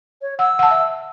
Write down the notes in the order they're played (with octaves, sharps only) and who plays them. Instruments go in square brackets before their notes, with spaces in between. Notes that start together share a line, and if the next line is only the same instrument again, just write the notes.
[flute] C#5
[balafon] F#5 [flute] E6
[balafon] F#5 A5
E5